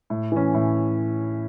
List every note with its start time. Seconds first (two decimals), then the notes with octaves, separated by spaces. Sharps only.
0.10 A2
0.32 E3 C#4
0.54 A2